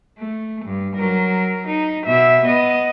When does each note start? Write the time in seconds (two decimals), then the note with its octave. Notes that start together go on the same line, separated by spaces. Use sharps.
0.18 A3
0.65 G2
0.96 F#3 A#4
1.67 D#4
2.06 B2 E5
2.45 B3 D#5